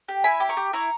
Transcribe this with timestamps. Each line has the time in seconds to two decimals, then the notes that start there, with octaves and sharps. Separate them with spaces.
0.08 G4
0.24 E4 G#5 B5
0.40 G4
0.49 A#5 C#6
0.57 G4
0.73 E4 A#5 C#6